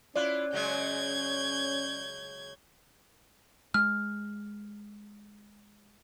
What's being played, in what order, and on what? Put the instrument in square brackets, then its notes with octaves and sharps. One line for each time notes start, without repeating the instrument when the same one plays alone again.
[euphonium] C#4 [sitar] E4 F4 [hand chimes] D5 F#6
[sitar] C#3 F#3 G#3 [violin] G6 G#6
[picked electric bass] G#3 [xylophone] F6